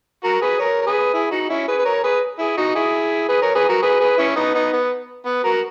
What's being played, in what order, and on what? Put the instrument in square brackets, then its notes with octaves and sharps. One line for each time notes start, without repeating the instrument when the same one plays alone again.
[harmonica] F#4 A#4
G#4 B4
A#4 C#5
A#4
G#4 B4
E4 G#4
D#4 F#4
C#4 E4
G#4 B4
B4
A#4 C#5
G#4 B4
E4 G#4
D#4 F#4
E4 G#4
G#4 B4
A#4 C#5
G#4 B4
F#4 A#4
G#4 B4
G#4 B4
C#4 E4
B3 D#4
B3 D#4
B3
B3
F#4 A#4